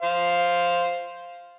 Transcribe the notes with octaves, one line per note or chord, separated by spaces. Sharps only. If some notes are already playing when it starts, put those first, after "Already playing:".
C5 F5